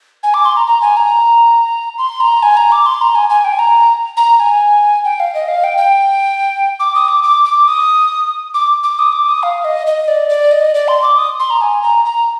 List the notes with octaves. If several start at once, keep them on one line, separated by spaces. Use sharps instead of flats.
G#5
D6
C6
A#5
A#5
G#5
A#5
C6
A#5
G#5
A#5
D6
C6
A#5
G#5
G#5
G5
G#5
A#5
A#5
G#5
G5
F5
D#5
F5
G5
G5
D6
D#6
D6
D6
D6
D#6
D6
D6
D#6
D6
D#6
F5
D#5
D#5
D5
D5
D#5
D5
C6
D6
D#6
C6
A#5
G#5
A#5
A#5